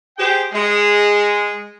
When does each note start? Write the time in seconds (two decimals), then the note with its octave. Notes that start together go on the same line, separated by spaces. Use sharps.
0.18 G4 G#4 C5 G5
0.53 G#3